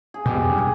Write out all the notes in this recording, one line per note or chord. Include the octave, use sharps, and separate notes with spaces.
G#4
B2 G4
F2
G2
G#4